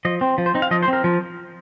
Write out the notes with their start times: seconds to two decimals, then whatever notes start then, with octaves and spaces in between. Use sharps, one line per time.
0.05 F3 D#5
0.21 C4
0.38 F3
0.46 C5
0.54 C4 D#4
0.62 F5
0.71 F3 D#5
0.83 C5
0.88 C4
0.93 A#4
1.04 F3